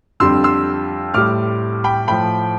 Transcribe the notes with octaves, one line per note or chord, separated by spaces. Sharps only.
F2 D3 G3 C6 E6
C6 E6
A2 G3 D6 F6
G5 B5
A2 F3 G5 B5